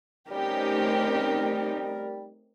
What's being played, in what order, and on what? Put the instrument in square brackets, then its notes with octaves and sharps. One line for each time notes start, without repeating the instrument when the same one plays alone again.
[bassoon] G3 [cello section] A3 D#4 [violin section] C4 C#4 G4 [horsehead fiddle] A#4